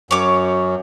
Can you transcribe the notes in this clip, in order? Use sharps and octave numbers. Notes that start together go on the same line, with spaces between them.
F#2 C#5 D6